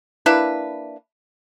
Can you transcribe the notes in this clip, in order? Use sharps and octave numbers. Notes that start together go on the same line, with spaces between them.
A#3 D4 E4 B4